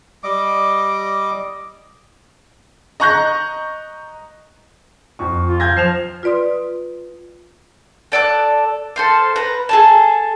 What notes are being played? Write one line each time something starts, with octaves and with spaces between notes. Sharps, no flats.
G3 D#5 D6
D#5 A#5 C#6 F#6 G6 A#6
F2 C#6
F4
G6 G#6 A#6
F3 C7 E7 F7
F4 B4 D5 C6 D#6
A4 D5 E6 F#6
A4 C5 F5
B4 A#5
G#4 A4 A5